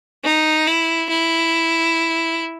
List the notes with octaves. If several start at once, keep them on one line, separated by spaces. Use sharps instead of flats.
D#4
E4
E4